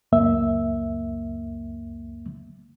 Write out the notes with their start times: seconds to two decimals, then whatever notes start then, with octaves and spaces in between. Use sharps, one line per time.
0.12 C#2 F#2 A#3 E5